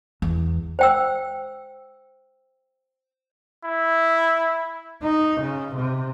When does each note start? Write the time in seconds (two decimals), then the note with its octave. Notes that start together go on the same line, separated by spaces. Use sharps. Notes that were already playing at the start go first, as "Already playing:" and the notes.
0.22 E2
0.79 C5 G5 E6
3.64 E4
5.03 D#4
5.40 C#3
5.75 C3